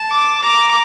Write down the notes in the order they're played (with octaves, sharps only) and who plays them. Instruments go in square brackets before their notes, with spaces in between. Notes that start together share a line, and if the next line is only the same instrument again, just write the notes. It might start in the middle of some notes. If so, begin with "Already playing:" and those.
Already playing: [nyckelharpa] A5
[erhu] D6
[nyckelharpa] A#5 [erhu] D6